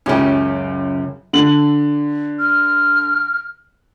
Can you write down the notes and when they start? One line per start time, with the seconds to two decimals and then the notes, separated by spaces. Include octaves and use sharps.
0.06 C#2 F#2 C#3 C#4 G4 G5
1.33 D3 F#7
2.39 F6